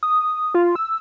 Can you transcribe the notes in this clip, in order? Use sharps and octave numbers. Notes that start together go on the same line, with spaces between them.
D#6
F4
E6